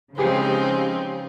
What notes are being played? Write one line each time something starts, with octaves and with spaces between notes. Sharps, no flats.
C#3 F3 G#3 C4 D#4 G4 G#4 B4